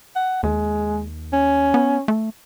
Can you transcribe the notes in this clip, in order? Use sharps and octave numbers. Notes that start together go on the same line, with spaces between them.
F#5
D#2 G#3
C#4
B3
A3